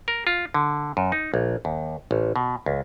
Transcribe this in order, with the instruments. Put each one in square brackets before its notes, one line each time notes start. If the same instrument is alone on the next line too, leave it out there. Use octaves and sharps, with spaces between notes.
[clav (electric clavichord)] A#4
F4
D3
F#2
D#4
A#1
D#2
A1
B2
C#2